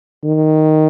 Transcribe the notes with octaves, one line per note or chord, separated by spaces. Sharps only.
D#3